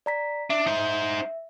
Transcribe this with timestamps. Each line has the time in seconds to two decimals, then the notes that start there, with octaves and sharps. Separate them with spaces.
0.06 D5 A#5 B6
0.50 D4 E5
0.67 D#4 C5